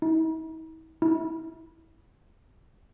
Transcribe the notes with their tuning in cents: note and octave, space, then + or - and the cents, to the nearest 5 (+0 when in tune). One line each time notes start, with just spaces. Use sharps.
E4 -45
E4 -20